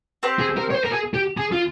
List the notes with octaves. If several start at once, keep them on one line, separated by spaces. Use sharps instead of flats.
C4 G4 C5
G#4
A#4
C#5
C5
A#4
G#4
G4
G#4
F4